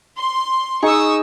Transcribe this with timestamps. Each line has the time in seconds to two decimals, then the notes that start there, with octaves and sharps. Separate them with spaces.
0.17 C6
0.82 D#4 G#4 C#6 D#6 E6